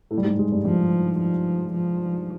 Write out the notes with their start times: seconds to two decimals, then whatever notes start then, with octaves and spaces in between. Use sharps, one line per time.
0.11 A2 A3
0.18 G3
0.24 G#2 G#3
0.39 G#2 G#3
0.52 G2 G3
0.65 G2 F3 G3
1.20 F3
1.74 F3